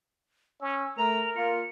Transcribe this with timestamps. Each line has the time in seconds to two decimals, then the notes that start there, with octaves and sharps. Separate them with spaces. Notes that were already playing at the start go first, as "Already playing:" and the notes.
0.61 C#4 E6
0.98 A3 A#4 A#5 F7
1.36 A#3 F4 C#7